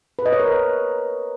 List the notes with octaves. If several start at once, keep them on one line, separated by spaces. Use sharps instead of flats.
B4
D#5
C#5
A#4
B4